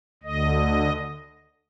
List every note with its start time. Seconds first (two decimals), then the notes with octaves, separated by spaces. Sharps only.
0.23 D2 D3 D#5